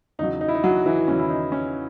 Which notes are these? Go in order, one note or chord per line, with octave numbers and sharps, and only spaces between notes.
E2 C#3 F#3 D#4
D#4
E4
D#4
F#3 F#4
E3 E4
E2 C#3 F#3 C#4
E4
D#4
C#4